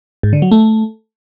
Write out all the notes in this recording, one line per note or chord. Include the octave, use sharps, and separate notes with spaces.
G#2
D3
F#3
A3